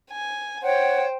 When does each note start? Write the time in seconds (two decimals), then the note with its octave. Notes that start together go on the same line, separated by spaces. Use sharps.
0.11 G#5
0.63 C5 C#5 F#5 G5